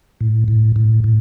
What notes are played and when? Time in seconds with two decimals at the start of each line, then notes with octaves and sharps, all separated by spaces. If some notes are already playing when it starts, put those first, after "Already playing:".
0.21 A2
0.48 A2
0.76 A2
1.04 A2